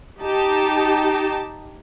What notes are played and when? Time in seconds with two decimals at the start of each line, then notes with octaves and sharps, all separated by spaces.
0.20 D#4 G4 A5